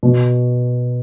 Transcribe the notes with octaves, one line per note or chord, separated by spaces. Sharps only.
B2